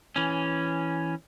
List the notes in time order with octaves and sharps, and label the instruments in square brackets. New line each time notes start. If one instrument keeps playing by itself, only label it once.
[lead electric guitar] E3 C#4